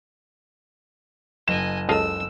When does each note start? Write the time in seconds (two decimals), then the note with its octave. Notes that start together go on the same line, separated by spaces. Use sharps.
1.48 F#1 D#5 G#5 E7
1.89 C#2 A4 D#5 F5 E6